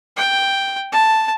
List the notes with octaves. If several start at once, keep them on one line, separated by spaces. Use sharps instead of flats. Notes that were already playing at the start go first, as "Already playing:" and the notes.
G5
A5